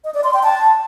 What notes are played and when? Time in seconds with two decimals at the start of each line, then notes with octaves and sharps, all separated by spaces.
0.04 D#5
0.14 D5
0.24 C6
0.34 G5
0.43 A5